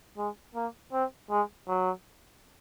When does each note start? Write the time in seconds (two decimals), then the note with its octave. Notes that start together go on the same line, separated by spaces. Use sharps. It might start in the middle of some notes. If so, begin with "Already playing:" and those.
0.17 G#3
0.55 A#3
0.93 C4
1.30 G#3
1.68 F#3